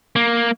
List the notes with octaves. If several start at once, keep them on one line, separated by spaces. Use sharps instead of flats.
A#3